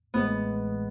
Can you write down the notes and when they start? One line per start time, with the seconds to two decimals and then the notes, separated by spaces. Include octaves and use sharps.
0.14 A1 A2 E3 G#3 B3